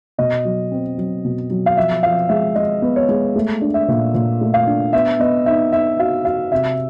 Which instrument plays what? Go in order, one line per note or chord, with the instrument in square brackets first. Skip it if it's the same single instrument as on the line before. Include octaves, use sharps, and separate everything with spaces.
[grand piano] B2 [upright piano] D#5
[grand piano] F#3
C4
F#3
B2
F#3
[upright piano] F5
[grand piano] F3 [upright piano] E5
[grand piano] F3 [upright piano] F5
[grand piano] G#3 [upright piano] E5
[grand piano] G#3 [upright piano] D#5
[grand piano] B3
[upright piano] C#5
[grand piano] G#3
A3
D4
[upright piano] E5
[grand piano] A#2
A#2
A3
[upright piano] F5
[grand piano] D4
[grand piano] B3 [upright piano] E5
[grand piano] B3 [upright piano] D#5
[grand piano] D#4 [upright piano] E5
[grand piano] D#4 [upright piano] E5
[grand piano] F#4 [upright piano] F5
[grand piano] F#4 [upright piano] F5
[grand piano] C3 [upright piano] E5